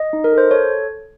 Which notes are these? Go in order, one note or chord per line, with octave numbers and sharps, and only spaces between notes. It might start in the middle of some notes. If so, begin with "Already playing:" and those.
Already playing: D#5
D#4
A#4
A4
C5
A4 C#5